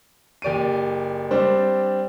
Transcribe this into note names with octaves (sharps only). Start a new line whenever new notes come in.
F#1 G4 D5 D7 D#7
G3 C4 D4 C5